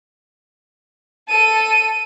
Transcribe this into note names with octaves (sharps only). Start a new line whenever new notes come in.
A4 D#7